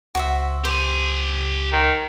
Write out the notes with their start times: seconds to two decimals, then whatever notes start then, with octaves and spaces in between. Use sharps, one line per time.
0.15 C#2 F#4 C5 E5
0.65 G4 C5 G#5
1.73 D#3